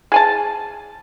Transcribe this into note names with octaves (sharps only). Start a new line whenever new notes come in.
G#4 G#5 A5